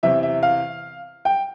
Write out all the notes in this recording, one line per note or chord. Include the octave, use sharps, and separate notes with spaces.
E2 C3 E3 E5
E5
F5
G5